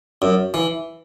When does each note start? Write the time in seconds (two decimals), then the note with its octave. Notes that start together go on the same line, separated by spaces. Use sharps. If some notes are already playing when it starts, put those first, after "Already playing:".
0.22 F#2
0.54 E3